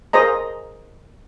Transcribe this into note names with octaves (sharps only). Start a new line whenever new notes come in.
G#4 A#4 C5 D#5 A#5